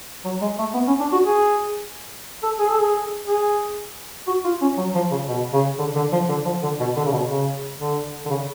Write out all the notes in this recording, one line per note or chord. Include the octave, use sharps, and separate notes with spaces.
F#3
G#3
A3
B3
C#4
D4
F#4
G#4
A4
G#4
A4
G#4
G#4
F#4
F4
C#4
F#3
F3
C#3
B2
C#3
D3
D3
F3
D3
F3
D3
B2
D3
C#3
B2
C#3
D3
D3
C#3